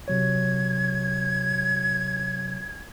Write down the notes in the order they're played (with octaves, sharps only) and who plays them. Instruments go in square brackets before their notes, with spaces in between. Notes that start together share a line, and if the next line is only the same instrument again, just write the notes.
[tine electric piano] C3 F#3 C#5 [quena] G#6